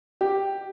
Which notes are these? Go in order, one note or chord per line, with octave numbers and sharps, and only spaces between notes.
G4